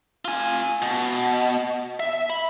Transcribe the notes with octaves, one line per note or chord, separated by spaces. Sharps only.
F4 G#5
B2
E5
B5